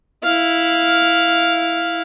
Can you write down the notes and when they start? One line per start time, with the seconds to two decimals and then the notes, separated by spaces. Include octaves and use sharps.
0.24 E4 F5